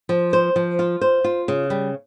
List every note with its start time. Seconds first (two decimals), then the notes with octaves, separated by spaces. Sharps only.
0.09 F3
0.33 C5
0.56 F3
0.79 F4
1.01 C5
1.24 F4
1.48 C#3
1.70 G3